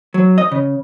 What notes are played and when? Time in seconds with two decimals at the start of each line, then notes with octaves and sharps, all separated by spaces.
0.14 F#3
0.38 D#5
0.52 C#3